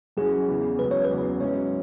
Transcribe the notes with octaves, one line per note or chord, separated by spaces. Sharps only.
F#2 E3 C#4 F#4 G#4
E2 C#3 E3 B3
C#2 C#3 F#3 B4
C#5
B4
E2 C#3 F#3
G#2 F#3 C#4 E4 C#5